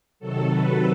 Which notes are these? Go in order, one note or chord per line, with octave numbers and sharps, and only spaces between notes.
C3 D#3 F#3 A4
B4